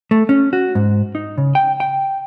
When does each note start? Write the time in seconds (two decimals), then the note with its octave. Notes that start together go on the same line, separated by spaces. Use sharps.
0.11 A3
0.29 C#4
0.53 F#4
0.75 G#2
1.15 D#4
1.38 C#3
1.55 G5
1.80 G5